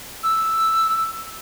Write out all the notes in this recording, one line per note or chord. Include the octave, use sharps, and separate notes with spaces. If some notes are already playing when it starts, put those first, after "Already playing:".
E6